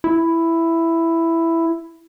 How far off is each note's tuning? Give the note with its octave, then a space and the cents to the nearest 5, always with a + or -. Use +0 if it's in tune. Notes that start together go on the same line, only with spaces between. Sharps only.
E4 +5